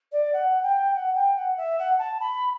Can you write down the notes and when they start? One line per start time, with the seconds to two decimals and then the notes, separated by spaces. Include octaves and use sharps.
0.12 D5
0.33 F#5
0.63 G5
0.95 F#5
1.15 G5
1.36 F#5
1.57 E5
1.79 F#5
1.99 A5
2.20 B5